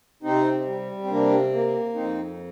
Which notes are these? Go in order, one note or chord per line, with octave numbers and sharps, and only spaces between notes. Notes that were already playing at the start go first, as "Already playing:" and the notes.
C3 C4 D#4
G3
C4
C3 A#3 D4
A#3
F2 C4 D#4